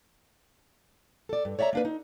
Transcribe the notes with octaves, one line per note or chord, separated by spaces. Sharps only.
A4 D5
G2
C#5 D5 E5 F#5 A#5
A#3 D4 B4
D#4